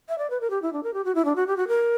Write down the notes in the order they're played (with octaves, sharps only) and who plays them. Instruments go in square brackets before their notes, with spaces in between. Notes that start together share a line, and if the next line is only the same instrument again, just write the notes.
[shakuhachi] E5
D5
B4
A#4
G4
E4
D4
A#4
G4
F#4
E4
D4
F#4
G4
F#4
A#4